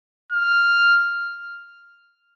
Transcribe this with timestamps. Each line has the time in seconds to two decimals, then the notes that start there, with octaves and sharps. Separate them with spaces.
0.32 F6